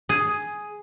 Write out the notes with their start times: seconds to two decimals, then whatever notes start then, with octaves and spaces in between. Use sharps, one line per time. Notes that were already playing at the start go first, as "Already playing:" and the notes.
0.09 G#4